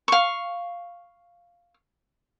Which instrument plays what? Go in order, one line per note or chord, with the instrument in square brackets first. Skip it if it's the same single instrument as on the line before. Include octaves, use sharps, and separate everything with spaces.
[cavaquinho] F5 C#6